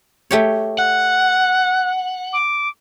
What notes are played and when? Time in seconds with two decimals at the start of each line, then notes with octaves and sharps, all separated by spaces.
0.31 A3 G4 C#5
0.78 F#5 F#6
2.33 D6